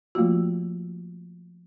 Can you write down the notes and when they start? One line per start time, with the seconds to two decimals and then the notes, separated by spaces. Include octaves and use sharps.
0.15 F3 A3 A#3 F4 F#4